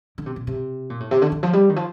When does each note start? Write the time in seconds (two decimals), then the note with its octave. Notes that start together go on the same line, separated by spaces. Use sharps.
0.18 D3
0.26 C3
0.36 A#2
0.47 C3
0.90 A#2
1.00 A2
1.11 C3
1.22 D3
1.32 D3
1.43 F3
1.53 G3
1.69 D#3
1.76 F3